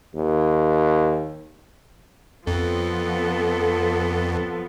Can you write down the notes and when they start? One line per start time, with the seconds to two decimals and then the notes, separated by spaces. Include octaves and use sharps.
0.15 D#2
2.47 F2 F3 B3 A4